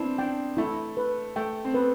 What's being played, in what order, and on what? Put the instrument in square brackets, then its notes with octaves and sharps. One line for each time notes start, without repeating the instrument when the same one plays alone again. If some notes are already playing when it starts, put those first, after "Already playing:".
Already playing: [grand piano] B3 C4 D4 [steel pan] E4
[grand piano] D4 [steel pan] G5
[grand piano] A3 [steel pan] E4
[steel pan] B4
[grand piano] A3 [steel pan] G5
[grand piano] C4
[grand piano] B3 [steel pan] B4